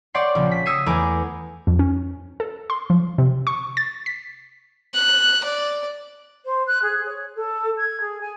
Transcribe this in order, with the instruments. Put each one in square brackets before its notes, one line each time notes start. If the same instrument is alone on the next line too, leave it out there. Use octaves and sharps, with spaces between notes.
[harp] C#5 D5 F#5 G5 C6 C7
A#1 C#3
B6
D#6 E6 G#6 C7 C#7 D#7
E2 A3 B4 G#5 A#5 D6
[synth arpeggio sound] F2
C#4
A4
C6
F3
C3
C#6
A6
B6
[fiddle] F#6
D5
[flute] C5
F#6
G#4
C#5
A4
G#6
G#4
G#5